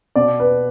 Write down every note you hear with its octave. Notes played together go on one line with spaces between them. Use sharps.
B2 D5
B4